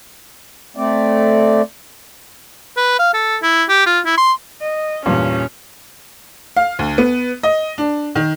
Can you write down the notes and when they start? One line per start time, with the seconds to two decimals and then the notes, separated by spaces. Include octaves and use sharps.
0.77 A3 C4 D5
2.77 B4
2.99 F5
3.14 A4
3.43 E4
3.69 G4
3.86 F4
4.06 E4
4.18 C6
4.61 D#5
5.06 E2 G2 A#2 C#4
6.57 F5
6.79 D2
6.98 B3
7.43 D#5
7.78 D4
8.16 D#3